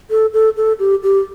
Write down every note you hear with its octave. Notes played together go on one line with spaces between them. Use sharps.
A4
A4
A4
G4
G4